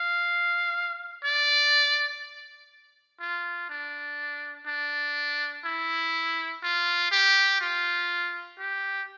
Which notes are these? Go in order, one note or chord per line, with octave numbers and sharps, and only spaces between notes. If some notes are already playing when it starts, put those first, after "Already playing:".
Already playing: F5
D5
F4
D4
D4
E4
F4
G4
F4
G4